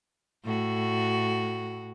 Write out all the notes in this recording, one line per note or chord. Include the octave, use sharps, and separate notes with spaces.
A2 F#4